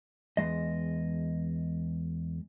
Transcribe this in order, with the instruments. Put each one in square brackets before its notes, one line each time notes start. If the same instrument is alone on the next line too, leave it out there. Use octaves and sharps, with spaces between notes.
[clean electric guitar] E2 F3 G#3 D#5